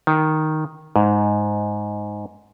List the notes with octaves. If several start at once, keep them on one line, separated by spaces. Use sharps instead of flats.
D#3
G#2